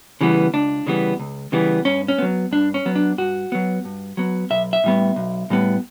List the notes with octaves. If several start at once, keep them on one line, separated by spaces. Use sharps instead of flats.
C#3 E3 G3 B3
C#2 D4
C#3 E3 G3 B3
C#2
C#3 E3 G3 B3
G2 C#4
C#4
F#3 B3
G2 D4
C#4
F#3 B3
D4
G2 F#4
F#3 B3
G2
F#3 B3
B1 E5
E5
A2 G3 B3
B1
A2 G3 B3